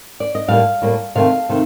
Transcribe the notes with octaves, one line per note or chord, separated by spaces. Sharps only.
D5
D#5
A2 G3 A#3 F5
A2 G3 A#3
C3 D#3 A3 F5
C3 D#3 A3